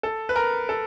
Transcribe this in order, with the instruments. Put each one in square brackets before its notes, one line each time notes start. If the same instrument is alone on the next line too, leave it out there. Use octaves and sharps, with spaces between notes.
[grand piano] A4
B4
A#4
A4